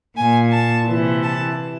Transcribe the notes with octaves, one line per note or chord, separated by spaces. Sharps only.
A#2 G#5
A5
C3 E3
A5